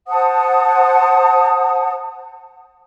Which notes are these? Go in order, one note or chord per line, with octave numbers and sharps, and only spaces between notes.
C5 F#5 A5 D#6